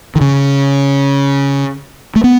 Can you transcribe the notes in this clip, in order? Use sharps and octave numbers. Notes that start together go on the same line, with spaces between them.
D#3
C#3
A3
B3